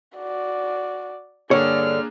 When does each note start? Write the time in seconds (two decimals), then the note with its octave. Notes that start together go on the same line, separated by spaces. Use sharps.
0.17 F#4 D5
1.51 G2 D3 A#3 D4 G#4 C#5 D5 F6